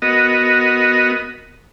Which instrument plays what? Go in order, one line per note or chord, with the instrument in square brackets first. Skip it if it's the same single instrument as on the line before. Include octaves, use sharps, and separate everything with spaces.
[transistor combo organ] B3 F#4 A#4 D#5